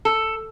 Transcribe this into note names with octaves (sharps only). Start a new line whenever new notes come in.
A4